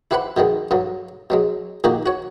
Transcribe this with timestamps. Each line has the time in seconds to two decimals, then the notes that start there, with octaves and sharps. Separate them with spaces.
0.11 E4 G4 B4 C5 F#5 B5
0.37 B2 D3 D#3 G#3
0.71 G2 D3 F#3
1.30 B2 F#3 G#3
1.84 A#2 D#3 D#4 F#4 G4
2.06 F#4 C#5